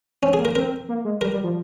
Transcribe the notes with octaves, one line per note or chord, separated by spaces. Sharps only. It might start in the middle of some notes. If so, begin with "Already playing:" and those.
C4 C#4
G#4
A#3
A#4
C4 A#4
A#3
G#3
G3 A#4
G3
F3